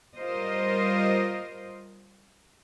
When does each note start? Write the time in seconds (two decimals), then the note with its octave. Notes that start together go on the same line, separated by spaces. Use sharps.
0.16 G3 F4 A#4 C5 D#5